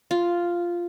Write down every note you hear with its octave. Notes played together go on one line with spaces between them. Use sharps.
F4